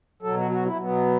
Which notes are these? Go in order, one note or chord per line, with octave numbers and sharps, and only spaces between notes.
B2 F#3 A4
F#4
F#4
E4
B2 F#3 B3